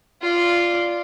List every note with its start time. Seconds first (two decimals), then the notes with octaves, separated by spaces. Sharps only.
0.22 F4 D5